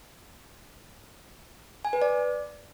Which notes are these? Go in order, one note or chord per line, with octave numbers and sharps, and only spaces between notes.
G#5
B4
D5